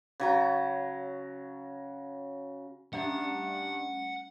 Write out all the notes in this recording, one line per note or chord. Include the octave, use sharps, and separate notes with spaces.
C#3 F#3 A#5
G2 G3 A3 C#4 D4 F#5